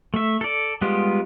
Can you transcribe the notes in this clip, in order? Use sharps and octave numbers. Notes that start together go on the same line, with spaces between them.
A3 E5
A4 D5
G3 G#3 B3 F4 G4